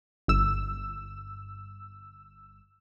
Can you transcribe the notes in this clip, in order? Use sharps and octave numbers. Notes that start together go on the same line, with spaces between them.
G1 E6